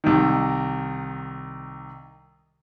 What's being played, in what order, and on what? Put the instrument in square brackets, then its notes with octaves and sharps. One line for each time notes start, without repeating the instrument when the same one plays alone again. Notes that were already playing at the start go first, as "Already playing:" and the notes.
[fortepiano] C2 D#3